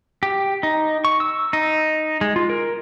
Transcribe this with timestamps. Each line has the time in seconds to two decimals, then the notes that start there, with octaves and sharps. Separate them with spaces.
0.23 G4
0.63 D#4
1.05 C#6
1.20 E6
1.53 D#4
2.21 G#3
2.36 F4
2.50 A#4